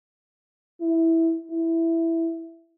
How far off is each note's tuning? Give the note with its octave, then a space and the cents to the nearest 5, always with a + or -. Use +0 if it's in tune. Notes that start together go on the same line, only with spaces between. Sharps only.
E4 -5
E4 +5